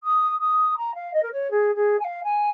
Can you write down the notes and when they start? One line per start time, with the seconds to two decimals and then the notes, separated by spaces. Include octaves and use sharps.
0.03 D#6
0.39 D#6
0.77 A#5
0.94 F5
1.13 D#5
1.22 A#4
1.32 C#5
1.50 G#4
1.75 G#4
1.99 G#5
2.04 F5
2.23 G#5